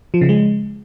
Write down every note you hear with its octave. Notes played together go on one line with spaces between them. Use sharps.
F3
C#3
G#3